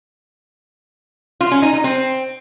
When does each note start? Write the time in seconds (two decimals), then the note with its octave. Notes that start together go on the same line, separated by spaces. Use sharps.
1.41 F4
1.51 C#4
1.62 D#4
1.73 D#4
1.84 C4